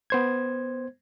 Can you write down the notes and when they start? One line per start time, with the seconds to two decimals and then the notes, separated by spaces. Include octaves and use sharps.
0.10 B3 C5 G#6